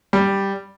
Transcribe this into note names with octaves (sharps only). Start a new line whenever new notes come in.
G3